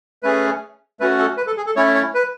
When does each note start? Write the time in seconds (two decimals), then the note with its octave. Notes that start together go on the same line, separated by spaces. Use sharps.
0.23 A3 C#4 G#4 B4
1.00 A3 C#4 F#4 B4
1.19 A4
1.37 B4
1.47 A4
1.57 G#4
1.66 A4
1.76 A3 C#4 E4 C#5
1.94 C#5
2.14 B4